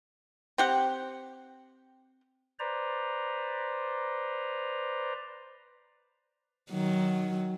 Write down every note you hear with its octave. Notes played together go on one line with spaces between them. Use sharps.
C4 G4 F#5
B4 C5 D5 A#5
D#3 F#3